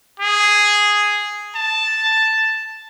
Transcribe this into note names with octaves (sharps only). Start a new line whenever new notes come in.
G#4
A5